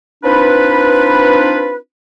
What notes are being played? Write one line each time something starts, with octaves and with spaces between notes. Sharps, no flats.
C4 D4 D#4 F4 B4